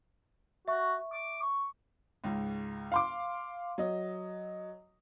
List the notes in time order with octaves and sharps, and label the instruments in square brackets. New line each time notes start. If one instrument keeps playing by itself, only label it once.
[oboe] F#4 [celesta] E5 C#6
[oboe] D6
C#6
[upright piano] C#2 G#2
F5 C6 D6
F#3 D#5